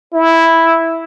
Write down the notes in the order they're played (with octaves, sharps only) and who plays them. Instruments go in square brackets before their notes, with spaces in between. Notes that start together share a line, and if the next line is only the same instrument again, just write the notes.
[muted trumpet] E4